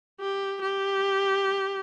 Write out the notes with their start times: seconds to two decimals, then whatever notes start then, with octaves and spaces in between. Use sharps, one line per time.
0.20 G4
0.61 G4